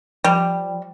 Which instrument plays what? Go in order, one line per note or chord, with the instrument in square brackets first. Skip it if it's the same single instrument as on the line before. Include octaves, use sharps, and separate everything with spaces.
[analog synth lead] F3 [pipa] G3